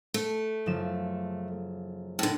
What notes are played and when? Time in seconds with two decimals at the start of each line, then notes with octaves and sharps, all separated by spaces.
0.14 A3
0.66 F#1 F3 E7
2.19 A2 D3